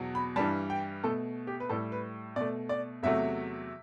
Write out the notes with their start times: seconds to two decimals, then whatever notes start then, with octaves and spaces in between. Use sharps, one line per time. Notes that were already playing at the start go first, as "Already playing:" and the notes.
Already playing: E2 B2 F#3
0.15 B5
0.36 G2 E3 G3 A5
0.70 G5
1.04 B2 A3 A4
1.47 G4
1.60 B4
1.69 A2 G3 A4
1.92 B4
2.36 B2 A3 D5
2.69 D5
3.03 E2 C3 F#3 A3 E5